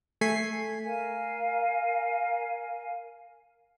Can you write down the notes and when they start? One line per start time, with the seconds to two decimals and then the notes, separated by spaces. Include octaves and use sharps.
0.21 A3 A4 G#5 G#6 B6 C7
0.84 A#4 F5 G#5